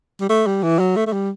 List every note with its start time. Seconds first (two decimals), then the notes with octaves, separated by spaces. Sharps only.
0.21 G3
0.29 A3
0.47 G3
0.63 E3
0.79 F#3
0.96 A3
1.07 A3
1.13 G3